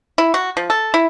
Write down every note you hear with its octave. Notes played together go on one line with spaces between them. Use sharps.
E4
F#4
F3
A4
E4